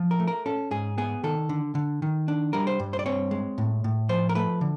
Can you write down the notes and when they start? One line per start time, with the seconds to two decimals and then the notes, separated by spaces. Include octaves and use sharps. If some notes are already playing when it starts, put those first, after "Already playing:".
Already playing: F3
0.11 A#4
0.20 A3
0.28 A#4
0.46 C#4 A4
0.71 G#2 G#4
0.98 B3 G#4
1.23 D#3 A4
1.49 D3
1.75 D3
2.02 D#3
2.28 D4
2.53 G3 A#4
2.67 C5
2.79 G2
2.93 C5
2.99 D5
3.06 C4 C#5
3.31 G#3
3.58 A2
3.84 A2
4.09 F3 C5
4.29 A#4
4.35 A3 B4
4.61 D3